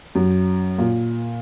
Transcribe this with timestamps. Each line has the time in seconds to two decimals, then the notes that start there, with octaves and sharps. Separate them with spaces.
0.15 F#2
0.78 A#2